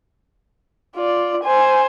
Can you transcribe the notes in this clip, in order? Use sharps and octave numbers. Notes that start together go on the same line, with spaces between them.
F4 D5
C5 G#5